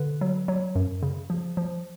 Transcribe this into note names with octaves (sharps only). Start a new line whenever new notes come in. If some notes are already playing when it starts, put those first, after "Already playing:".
Already playing: D3 B4
F#3
F#3
F#2
C#3
F3
F3